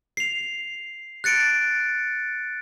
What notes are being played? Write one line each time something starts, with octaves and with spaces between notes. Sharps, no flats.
C7 F7
F#6 A6 C#7 D7